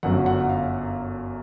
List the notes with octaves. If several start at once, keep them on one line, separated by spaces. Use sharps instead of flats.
G1 F#2 D3 F#3 F#5
F#5
F5